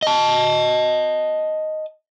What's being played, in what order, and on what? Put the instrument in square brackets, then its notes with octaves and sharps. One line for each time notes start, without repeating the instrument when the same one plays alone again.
[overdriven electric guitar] D#5 A5